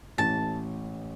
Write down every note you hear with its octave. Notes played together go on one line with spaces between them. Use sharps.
A1 A2 E3 A5